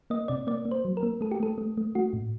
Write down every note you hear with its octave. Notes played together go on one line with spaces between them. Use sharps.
A#3 D#5
C3 D5
A#3 D5
A#3
C5
F#3
A#4
A#3
A3 A4
G4
A3 A4
A3
A3
A3 F#4
A2